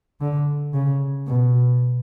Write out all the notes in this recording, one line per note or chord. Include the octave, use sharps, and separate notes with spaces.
D3
C#3
B2